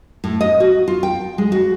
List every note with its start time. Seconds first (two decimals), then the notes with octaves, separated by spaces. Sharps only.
0.24 A2
0.41 D#5
0.60 F#4
0.88 F4
1.03 G5
1.38 G#3
1.52 F#4